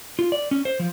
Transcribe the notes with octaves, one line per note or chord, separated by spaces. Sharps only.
F4
D5
C#4
C5
F3